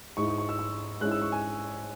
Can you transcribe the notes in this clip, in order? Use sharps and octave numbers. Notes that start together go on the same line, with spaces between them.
G#2 G#3 E4 C#6
C#6
C#6
E6
E6
G#2 G#3 C#4 E4 F#6
E6
C#6
G#5